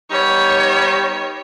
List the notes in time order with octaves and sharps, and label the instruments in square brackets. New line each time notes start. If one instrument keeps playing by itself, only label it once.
[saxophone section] G3 B3 D#4 [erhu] C#5